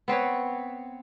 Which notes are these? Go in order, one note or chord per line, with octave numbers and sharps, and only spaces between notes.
B3 C4 B4 C#5